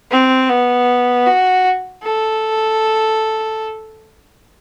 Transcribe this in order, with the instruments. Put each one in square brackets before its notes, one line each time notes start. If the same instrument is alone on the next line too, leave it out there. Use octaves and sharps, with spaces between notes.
[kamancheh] C4
B3
F#4
A4